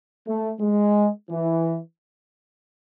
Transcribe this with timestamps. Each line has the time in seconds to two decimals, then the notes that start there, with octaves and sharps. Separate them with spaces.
0.27 A3
0.61 G#3
1.30 E3